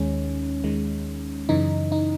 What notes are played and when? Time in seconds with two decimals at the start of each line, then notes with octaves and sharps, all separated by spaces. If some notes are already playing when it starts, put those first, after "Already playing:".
Already playing: D#2 D#3 G#3 C#4
0.64 D#2 D#3 G#3
1.49 F#2 C#3 E3 D#4
1.92 D#4